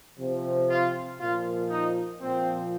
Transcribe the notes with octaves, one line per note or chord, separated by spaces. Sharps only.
C3 F3
F4
A#2 F3 F4
D#4
A#2 F3 C4